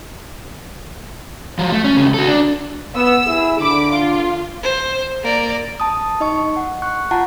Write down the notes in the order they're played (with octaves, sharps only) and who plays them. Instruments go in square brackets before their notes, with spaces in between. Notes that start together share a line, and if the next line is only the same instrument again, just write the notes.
[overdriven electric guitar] F3 F#3
A3
C#4
D2 C#3
F#4 A4
D4
[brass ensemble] B3 [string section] E6
[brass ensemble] E4 G#4
[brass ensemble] D3 [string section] B5 D6
[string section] F4
[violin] C5
A#3 D5
[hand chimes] A5 D#6
D#4 D#5 C#6
F#5
C#6 F#6
F4 F#5 A5 A#5